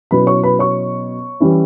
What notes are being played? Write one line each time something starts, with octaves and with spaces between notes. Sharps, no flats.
B2 F#3 C#4 E4 B4 B5
C#5 C#6
B4 B5
C#5 C#6
E3 G3 C#4 E4